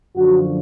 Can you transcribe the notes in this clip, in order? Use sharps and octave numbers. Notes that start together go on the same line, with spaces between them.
F#2 D3 F3 F#4